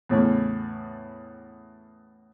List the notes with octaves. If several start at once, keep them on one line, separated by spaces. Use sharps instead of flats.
E2 A2 C#3